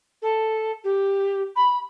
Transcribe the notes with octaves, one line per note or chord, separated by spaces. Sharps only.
A4
G4
B5